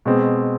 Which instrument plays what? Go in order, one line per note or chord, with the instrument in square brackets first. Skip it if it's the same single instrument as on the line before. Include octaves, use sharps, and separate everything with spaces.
[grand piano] B2 G#3 C4